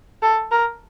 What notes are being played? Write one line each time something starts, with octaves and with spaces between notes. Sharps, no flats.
A4
A#4